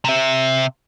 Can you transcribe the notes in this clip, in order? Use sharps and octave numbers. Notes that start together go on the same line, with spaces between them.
C3 E5